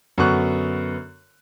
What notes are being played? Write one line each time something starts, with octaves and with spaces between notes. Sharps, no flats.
F#2 D3 B3 C#6 F#6